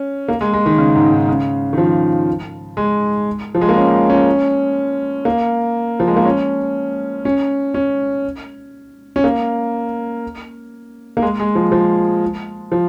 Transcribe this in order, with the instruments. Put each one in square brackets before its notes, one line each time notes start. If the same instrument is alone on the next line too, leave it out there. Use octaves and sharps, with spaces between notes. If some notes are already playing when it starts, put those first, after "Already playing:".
Already playing: [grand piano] C#4
A#3
G#3
G#3
D#3
C#3
G#2
G#2
C#3
D#3
F3
G#3
F3
G#3
A#3
C#4
C#4
A#3
F3
G#3
A#3
C#4
C#4
C#4
C#4
A#3
A#3
G#3
G#3
F3
F3
F3